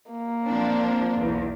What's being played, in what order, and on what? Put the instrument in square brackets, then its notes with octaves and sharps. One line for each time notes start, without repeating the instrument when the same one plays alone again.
[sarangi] A#3
[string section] F3 C4 D4
B1 E2